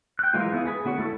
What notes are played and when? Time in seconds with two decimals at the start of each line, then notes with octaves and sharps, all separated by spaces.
0.19 G5 F#6
0.34 E3 F#3 G#3 A#3 F4
0.52 B3 E4 G#4
0.66 G#4 B4 G#5
0.85 D3 B3 F#4 C#5
0.98 A3 E4 A4 A5